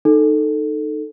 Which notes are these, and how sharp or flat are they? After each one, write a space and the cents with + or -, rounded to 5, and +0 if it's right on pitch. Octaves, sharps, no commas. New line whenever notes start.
D#4 -15 A4 +0